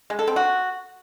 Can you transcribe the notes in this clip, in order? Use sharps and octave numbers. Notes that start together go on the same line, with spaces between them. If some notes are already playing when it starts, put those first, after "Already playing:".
G#3
A4
C4
F#4